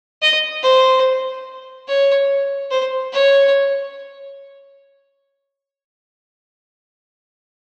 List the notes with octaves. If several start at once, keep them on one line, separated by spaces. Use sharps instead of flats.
D#5
C5
C#5
C5
C#5